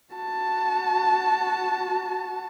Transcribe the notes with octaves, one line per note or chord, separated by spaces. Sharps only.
F#4 A5